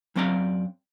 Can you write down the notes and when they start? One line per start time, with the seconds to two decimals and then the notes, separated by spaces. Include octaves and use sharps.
0.16 F#2 F#3 C4 D5 F5 A#5